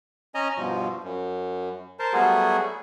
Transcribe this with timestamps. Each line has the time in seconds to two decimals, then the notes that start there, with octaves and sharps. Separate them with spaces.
0.35 C#4 D#5 G#5 A#5
0.57 G2 B2 F3
1.03 F#2
1.99 A#4 C5 A5
2.13 F#3 G3 A3 B3 F#4 G#4